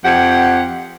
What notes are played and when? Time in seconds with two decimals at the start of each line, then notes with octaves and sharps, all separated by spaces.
0.05 F2 G4 F#5